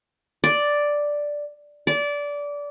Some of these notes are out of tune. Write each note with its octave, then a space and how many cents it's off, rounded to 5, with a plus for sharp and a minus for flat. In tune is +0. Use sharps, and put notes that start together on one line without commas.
D5 +0
D5 -20